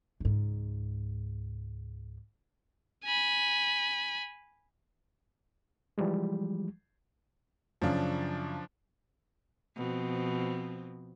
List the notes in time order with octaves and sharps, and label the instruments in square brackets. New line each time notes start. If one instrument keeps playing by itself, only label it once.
[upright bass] C#2 G#2
[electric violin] G#5 B5
[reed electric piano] E3 F3 G3 G#3
[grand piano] F#2 C#3 [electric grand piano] F3 D4
[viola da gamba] B2 F3 C4